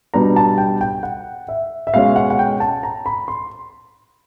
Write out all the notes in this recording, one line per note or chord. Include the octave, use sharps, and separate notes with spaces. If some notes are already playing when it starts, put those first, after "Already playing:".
B2 G3 B3 D4 A#5
A5
G5
G5
F#5
E5
E5
B2 G#3 C#4 F5
F#5
F#5
G5
A5
A#5
B5
C6